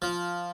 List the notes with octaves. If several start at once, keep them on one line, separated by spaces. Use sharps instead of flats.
F3